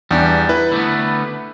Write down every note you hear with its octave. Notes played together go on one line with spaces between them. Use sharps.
E2 G3 D4
E4 B4
D3 A3 B3